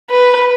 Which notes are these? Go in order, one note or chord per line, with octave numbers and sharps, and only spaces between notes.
B4